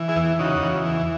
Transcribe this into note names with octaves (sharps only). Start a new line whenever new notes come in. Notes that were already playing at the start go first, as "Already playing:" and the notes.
Already playing: E3
E4 G#4
E2
C#3 D#4 F#4
E2
E3